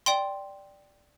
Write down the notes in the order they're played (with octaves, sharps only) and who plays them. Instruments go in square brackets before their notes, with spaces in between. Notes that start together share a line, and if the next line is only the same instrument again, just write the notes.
[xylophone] D5 G5 C6